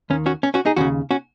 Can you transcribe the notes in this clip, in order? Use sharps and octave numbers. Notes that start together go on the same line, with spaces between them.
D#2 D#3 C#4
C#4 F#4
C#4
C#4 F#4
D#4 G#4
D#2 C#3 C#4 F#4
C#4 F#4